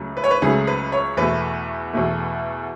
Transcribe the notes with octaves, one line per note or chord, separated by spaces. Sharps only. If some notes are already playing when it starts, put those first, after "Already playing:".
Already playing: C#2 C#3 F#3 A3
B4
C#5
B4
C#2 C#3 F#3 A3 G#4
B4
C#5
E2 B2 A3 B4
E2 B2 A3